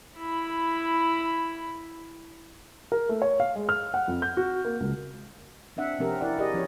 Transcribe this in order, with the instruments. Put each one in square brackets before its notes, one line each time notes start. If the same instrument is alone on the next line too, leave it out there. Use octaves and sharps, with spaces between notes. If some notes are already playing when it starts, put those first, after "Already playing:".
[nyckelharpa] E4 B5
[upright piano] A#4
A3
C#5
F5
G#3
F6
F#5
F2
G6
F#4
A#3
C#2
[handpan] C4 D4 E5 F#5
C3 F3 C4 C#4 G4 A#4
E4 A#4 D5 F#5
G4 G#4 A#4 D5 D#5
F3 C#4 F4 C#5